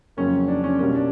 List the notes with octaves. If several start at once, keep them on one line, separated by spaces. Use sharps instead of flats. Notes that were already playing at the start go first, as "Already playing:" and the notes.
F2 C#3 F#3 A#3 C#4
D4
C#4
B2 G3 A#3 C#4
D4